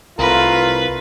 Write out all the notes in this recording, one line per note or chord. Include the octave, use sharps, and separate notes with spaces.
C2 A3 F4 A#4 B4